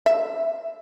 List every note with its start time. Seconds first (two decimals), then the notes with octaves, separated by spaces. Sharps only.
0.06 E5